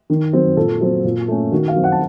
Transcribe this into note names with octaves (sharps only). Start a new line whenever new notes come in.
D#3
F#3 C4
A#2 A4
F#3 C4
A#2
A3 C#4
D#3 F#4
F5
F#3 C4
F#5
A5